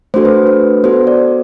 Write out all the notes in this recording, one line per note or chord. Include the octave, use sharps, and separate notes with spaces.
A3 D4 F#4 A4 C5
B4
B4
B3 F#4 A4 C5
D5